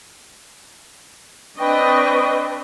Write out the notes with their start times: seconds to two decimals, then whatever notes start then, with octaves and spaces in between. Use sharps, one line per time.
1.59 C4 D4 B4 D#5 G5 C#6